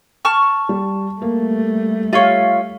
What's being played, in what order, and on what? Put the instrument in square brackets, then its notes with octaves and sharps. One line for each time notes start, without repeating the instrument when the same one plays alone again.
[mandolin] A5 C#6 F6
[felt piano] G3
[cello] G3 A3 [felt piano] A#3
[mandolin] F4 C#5 [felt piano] G4 [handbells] E5 F5